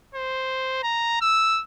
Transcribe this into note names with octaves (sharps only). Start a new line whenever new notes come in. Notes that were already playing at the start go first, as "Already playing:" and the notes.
C5
A#5
E6